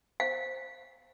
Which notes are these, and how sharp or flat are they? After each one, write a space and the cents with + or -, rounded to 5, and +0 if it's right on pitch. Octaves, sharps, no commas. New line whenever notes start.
C5 +0 F5 +0